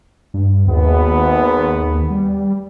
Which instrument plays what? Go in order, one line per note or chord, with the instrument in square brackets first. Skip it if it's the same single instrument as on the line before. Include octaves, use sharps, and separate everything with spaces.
[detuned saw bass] G2
[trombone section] G#1 B3 [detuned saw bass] D#2
[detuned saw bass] G3